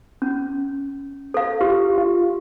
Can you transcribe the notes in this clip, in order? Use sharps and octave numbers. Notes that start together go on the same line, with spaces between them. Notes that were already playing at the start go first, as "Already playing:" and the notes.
C#4
A4 F5
F4 G4
F4